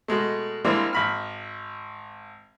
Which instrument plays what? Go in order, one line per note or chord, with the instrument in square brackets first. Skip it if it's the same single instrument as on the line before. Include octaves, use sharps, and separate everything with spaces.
[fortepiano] B2 G#3 A3
E3 G3 G#3 A#3 C4 D4
G#1 B5 F6